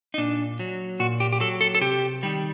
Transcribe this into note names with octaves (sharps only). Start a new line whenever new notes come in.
D#4
A#2 D4
F#3
A#2 F#4
G4
G4
F#3 A4
A4
A4
C3 G4
D#3 G3